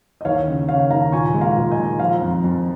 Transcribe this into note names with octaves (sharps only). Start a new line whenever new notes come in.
D#5
D#2 C#5 F5
C#3
C#3 C#5 F5
D#2 F5 A#5
A#2 G#5 C#6
G#3
F5 A#5
A#2
D#5 G#5
G#3
F3 F5 A#5
F2
F2